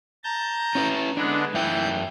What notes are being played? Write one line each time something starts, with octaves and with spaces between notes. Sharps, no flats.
A5 A#5 G6
C#4 E4 B4
D3 G#3 B3 D4
F#2 E3 E5 G5 G6